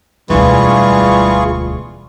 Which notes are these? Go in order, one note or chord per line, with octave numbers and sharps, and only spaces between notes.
E1 D2 E3 G3 F4 G#4 C#6